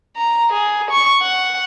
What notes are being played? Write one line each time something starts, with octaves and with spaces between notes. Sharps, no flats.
A#5
G#4
C#6
F#5